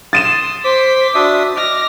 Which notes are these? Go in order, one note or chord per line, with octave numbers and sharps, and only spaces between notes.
C6 D#6 A6 D#7 E7
C5 C6 D6 B6
D4 F#4 E5 D#6
D#5 D6 F6 A#6